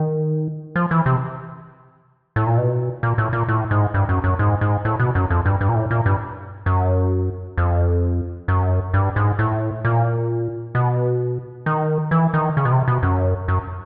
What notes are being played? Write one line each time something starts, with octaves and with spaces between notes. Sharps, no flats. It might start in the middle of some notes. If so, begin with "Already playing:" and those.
Already playing: D#3
F3
E3
C3
A2
A#2
B2
A#2
A2
A#2
A2
G#2
G2
F#2
F#2
G#2
G#2
A2
B2
F#2
F2
G2
G2
A#2
A2
A#2
G2
F#2
F2
F#2
G2
G#2
A2
A#2
B2
D#3
E3
D#3
C#3
B2
C3
B2
F#2
F#2